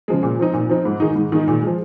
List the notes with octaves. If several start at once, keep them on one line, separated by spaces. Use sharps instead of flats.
C#3 F3 G#3
A#2
F3 C4 D#4
A#2
F3 C4 D#4
G#2
D#3 G#3 D#4
G#2
D#3 G#3 D#4
A#2
F3 G#3